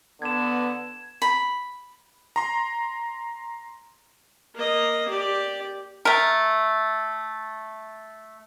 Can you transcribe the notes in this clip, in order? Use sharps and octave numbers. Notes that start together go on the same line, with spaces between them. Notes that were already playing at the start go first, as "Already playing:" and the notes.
D3 B3 G#6 E7
B5
A#5 C6
A#3 D#5
G4 D5
A3 A#4